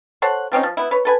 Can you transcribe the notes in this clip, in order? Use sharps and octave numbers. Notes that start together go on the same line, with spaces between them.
A4 C5 C#5 F#5
F3 C4 C#4 D#4
F3
B3 E4
B4 C#5
A4 B4 G#5